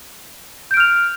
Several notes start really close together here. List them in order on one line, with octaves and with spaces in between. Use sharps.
G6 D7 F6 F7